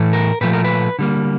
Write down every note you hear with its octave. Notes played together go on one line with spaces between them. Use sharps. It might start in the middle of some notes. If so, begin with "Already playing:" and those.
Already playing: A2 E3 A3
A#4
A#2 F3 A3 B4
A#4
B4
D3 G3 A#3